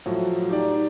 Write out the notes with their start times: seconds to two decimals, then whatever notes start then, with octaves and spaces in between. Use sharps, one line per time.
0.06 A2 F3 F#3
0.50 D#4 G4 D5